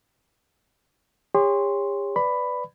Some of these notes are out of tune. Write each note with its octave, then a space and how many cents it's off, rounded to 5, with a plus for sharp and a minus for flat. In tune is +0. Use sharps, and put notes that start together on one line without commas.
G4 +45 C#5 +0 C6 +0
B4 +10 D5 +0 B5 +10